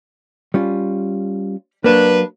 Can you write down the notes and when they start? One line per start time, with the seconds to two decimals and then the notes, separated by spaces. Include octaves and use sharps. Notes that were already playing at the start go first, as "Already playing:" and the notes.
0.54 G3 C#4 F4
1.84 F#3 A#3 D4 B4